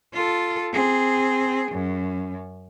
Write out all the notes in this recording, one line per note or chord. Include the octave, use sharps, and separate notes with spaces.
F4 A4
C4 G#4
F#2